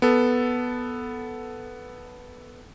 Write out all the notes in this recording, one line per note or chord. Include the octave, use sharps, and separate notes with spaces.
B3 A4